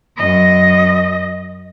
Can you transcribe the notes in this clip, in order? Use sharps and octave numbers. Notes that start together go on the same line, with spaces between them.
F#2 D#5